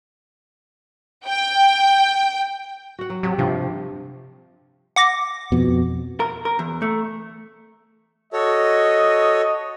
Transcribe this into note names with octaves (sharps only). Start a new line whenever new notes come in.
G5
F#4 F#5
F#3
C3 F#3 G4
G2 C3 F3
F#5 D6 A#6
F2 B2
A#4
A#4
E2
A3
F#4 A4 C#5 D#5